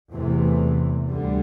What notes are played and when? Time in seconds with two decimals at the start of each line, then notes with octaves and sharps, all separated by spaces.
0.12 E2 C3 E3 A3
1.08 D2 D3 G3